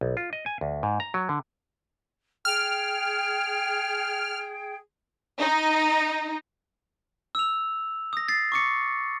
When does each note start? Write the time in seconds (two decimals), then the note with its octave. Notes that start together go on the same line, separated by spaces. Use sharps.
0.01 B1
0.17 F4
0.33 D#5
0.46 G#5
0.61 D2
0.83 G#2
1.00 A#5
1.14 F#3
1.29 D3
2.45 G#4 G5 F6
5.39 D#4
7.35 E6 F7
8.13 D#6 A#6
8.28 A6 C7
8.52 C#6 D6 C#7